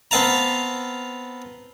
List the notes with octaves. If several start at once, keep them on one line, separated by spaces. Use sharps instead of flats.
B3 C4 F5 A5 A#5